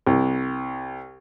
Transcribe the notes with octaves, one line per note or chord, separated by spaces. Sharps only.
C2